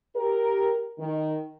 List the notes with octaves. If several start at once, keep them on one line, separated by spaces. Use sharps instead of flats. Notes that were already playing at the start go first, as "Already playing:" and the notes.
G4 A#4
D#3